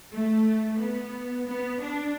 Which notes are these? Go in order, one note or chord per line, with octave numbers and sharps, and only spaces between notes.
A3
B3
B3
D4